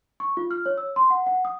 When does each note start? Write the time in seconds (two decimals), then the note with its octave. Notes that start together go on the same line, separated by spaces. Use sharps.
0.20 C#6
0.37 F4
0.51 F6
0.66 C#5
0.78 E6
0.96 C6
1.10 F#5
1.27 F#5
1.45 D#6